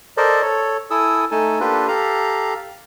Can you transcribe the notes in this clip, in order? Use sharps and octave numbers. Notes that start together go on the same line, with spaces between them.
A4 A#4 C5 D5 D#5
A4 C#5
E4 A4 G#5 D#6 E6
A3 D#4 A4 G#5 A5
A#3 D4 F4 G4 A4 B4
G4 A4 F5 A#5